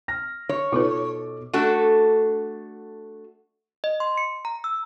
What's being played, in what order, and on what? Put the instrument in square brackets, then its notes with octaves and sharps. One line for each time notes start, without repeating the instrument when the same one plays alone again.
[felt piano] F6 A#6
[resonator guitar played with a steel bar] C#5
[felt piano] B2 A4 D6 [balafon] D#4 F4 B4
[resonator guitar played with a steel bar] A3 D4 F#4 A4
[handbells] D#5
C6
C#7
A#5
E6